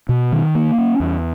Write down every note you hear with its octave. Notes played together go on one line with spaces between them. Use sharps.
B2
D#3
A#3
C#4
E2